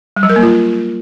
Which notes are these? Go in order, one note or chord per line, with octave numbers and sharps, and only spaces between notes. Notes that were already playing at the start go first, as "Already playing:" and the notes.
G3
F#3
A#4
A#3
F4